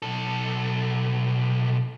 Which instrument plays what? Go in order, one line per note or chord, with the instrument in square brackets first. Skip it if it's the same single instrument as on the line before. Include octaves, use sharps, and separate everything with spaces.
[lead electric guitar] B1 A4